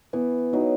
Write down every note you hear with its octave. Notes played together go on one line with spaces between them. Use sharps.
E3 B3
F#3 D#4